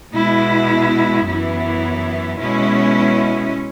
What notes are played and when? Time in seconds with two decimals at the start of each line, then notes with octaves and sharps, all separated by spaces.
0.13 B2 G#3 E4
1.26 F#2 E3 B3 E4
2.39 B2 G#3 C#4 E4